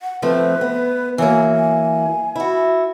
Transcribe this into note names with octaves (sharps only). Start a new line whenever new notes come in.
F#5
F3 A3 C4 B4
B3
E3 F#3 A#3 G#5
G#5
E4 F#4